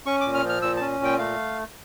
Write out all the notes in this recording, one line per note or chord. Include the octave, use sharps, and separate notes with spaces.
C#4 C#6
A#2 D6
F6
F3
F6
A#2 E6
C#4 A5
A#2 G5
A3 F5